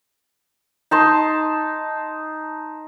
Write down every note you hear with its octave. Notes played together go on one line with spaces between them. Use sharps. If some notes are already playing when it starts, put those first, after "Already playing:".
D#4 A5 C6